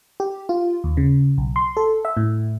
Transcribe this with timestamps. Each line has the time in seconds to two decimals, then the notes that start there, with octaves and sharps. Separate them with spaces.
0.20 G4
0.49 F4
0.84 D#2
0.97 C#3
1.38 B1
1.56 C6
1.77 A4
2.05 E5
2.17 A2